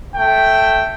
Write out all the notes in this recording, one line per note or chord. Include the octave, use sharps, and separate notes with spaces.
A3 G5